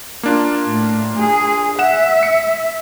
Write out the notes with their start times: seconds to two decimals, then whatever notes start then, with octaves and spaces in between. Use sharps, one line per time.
0.23 A#3 D4 F4
0.66 A2
1.17 G#4
1.79 E5 F#5 E7
2.23 C#7